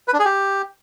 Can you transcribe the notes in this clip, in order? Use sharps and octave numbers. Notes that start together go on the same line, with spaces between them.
B4
D4
G#4
G4